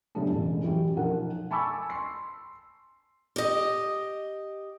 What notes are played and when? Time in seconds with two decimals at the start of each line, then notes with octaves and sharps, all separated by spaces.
0.15 F#2 C#3 G3 A3 B3 D4
0.30 E1 A1
0.63 E3 F#3 C#4 G4
0.96 B1 F3 A#4 F#5
1.51 G#5 A5 B5 C#6 D6 E6
1.90 C6 C7
3.36 G4 D#5